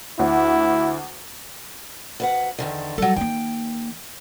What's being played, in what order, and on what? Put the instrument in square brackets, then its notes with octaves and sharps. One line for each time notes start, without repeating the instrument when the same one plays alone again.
[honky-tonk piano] D2 [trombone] E4
[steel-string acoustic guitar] D2 B4 F#5
E2 D3 D#3
[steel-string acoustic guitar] F#3 A4 [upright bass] G3
[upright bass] D#3 A#3 [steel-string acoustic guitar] G5